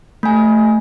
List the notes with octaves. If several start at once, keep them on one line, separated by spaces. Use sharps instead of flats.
A3 G#5